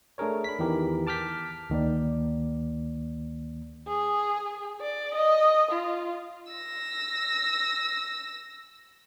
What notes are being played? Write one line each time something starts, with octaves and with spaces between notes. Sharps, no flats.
A3 D4 G#4 A#4 C#5
B5 B6
E2 D#3 E3 G4 A#4
A5 D6 F6 G6 B6
D2 D#3 A#3 D5
G#4
D5
D#5
F4
E6 A#6